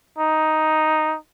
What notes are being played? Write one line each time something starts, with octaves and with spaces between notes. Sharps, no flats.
D#4